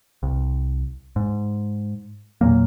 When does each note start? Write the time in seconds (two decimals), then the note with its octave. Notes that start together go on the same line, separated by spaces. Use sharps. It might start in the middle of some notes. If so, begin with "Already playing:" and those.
0.23 C2
1.16 G#2
2.41 E2 A#2 F#3 A#3